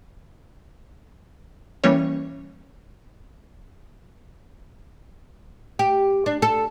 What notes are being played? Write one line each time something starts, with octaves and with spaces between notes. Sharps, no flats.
E3 G3 A#3 C#4 C#5
G4
D4
A4